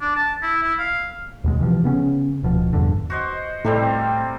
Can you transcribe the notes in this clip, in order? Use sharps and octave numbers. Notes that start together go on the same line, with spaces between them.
D4
A5
E4
E4
F5
D#2 B2 G#3
C3 E3 F3
C#3 B3 C#4
D1 B2 F3
G1 E2 G2 D3
F#4 C5 D#5
A2 C3 G3 A3 C4